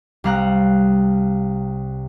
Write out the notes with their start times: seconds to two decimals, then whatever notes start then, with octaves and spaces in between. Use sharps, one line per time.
0.24 C2 G3 F5 A#5 F#6